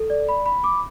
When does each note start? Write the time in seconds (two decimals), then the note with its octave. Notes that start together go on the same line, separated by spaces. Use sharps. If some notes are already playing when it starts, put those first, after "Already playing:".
Already playing: A4
0.10 D5
0.29 B5
0.46 B5
0.64 D6